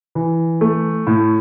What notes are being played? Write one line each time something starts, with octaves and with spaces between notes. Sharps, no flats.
E3
A3
A2